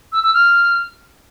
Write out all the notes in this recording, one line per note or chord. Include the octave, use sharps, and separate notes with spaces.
E6
E6
F6